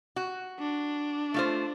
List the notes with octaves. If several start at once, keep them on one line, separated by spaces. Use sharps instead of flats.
F#4
D4
A3 F4 C5